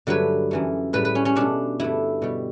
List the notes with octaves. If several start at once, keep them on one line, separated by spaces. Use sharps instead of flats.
G2 D3 F#3 A3 B4
F#2 E3 A3
A2 G3 B4
B4
C#4
C#4
B2 A3 D4
G2 D3 A3 E4
B2 G3